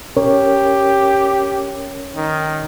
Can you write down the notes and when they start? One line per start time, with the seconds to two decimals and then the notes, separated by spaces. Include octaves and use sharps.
0.17 C#4 G4 A#4 C#5
2.16 D#3